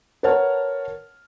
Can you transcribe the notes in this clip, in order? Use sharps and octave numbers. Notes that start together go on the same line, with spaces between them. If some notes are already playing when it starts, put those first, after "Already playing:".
A#4 B4 C#5 F#5 A5 F6